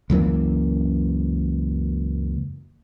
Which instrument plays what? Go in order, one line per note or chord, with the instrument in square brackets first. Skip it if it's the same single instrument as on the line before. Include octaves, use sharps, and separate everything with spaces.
[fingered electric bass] C#2 F#2 E3 A#3